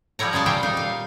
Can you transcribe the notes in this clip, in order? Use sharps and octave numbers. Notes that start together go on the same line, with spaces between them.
F3 G3 E4 C#5 A#5
C#3 G#3 G#5 A5
A#2 G3 E5 F5 G5
D#4 F5
F5